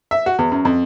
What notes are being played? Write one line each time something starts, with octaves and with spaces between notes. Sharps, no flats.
E5
F#4
E2
F#2
F2